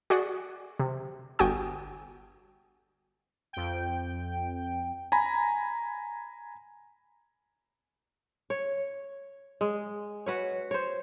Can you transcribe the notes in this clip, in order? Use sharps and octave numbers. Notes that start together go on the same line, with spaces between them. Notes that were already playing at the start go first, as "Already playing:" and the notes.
F#4 G#4 D5 F#5
C3
G1 F#4 G5 G#5 D#6
F2 G5
G#5 A#5 B5
C#5
G#3
F#4 B4 C#5
C5 C#5